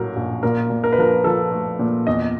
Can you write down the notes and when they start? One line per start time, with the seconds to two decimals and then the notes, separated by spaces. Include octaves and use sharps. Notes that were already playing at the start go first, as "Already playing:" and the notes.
Already playing: A#1 A2 F#3 A#4
0.16 A#1
0.43 A#2 A#4
0.70 A#2
0.84 A#4
0.92 B4
0.98 F3 A#4
1.24 F3 A4
1.52 A3
1.79 A#2
2.07 E2 D#5